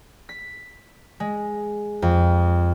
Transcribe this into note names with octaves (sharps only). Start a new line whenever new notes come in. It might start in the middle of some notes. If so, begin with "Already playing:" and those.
B6
G#3
F2